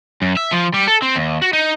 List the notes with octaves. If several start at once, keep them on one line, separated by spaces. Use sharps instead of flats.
F#2
E5
F3
G3
A4
C4
D#2
F#4
D#4